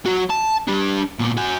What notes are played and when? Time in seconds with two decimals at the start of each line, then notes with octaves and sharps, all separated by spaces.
0.06 F#3 F#4
0.30 A5
0.68 D4 G4
1.19 A#2 B3
1.37 F#4 G#5